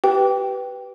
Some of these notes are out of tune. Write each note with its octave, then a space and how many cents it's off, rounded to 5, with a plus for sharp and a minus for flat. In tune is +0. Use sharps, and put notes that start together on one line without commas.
G4 -25 B4 +0 G5 +0